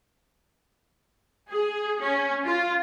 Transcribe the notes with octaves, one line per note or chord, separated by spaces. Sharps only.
G#4
C#4
F4